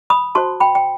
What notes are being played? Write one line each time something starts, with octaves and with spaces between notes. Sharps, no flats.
B5 D#6
F#4 C5 A5 C6
G5 B5
G5